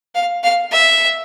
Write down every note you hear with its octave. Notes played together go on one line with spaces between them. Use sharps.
F5
F5
E5